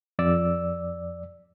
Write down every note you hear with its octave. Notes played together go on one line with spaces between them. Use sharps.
F2 D5 E6